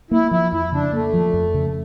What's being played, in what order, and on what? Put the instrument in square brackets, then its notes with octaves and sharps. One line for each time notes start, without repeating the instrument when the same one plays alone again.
[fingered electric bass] A#3 [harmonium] E4
[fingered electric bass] F3 [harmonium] E4
[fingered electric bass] F2 [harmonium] E4
[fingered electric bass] C#3 [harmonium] D4
[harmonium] A3 [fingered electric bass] A#3
[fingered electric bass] F3
F2
C#3